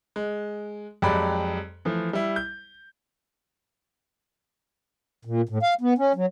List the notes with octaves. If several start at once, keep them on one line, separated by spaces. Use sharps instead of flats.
G#3
F2 F#3 G#3 G4 D5 B5
E3 F3 A3
G3 E4
G6
A#2
A2
F5
B3
C#4
F#3